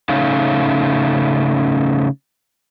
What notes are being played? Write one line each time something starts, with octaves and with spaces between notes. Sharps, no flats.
C#3 A3 C#4 D#4 F5